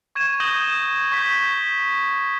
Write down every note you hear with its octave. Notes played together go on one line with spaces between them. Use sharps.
C#6 G#6 D#7 E7
D#6 G6 A#6 D#7 E7 G7
C#6 G6 B6